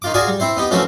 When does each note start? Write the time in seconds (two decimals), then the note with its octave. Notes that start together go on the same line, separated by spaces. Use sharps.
0.02 D#3 F4 D6
0.14 F4 F#4 G#4 A#4 D5 G#5
0.27 G3
0.40 C4 E4 C5
0.57 B3 D#4 G4
0.71 E3 F3 A3 C4 C#4 F#4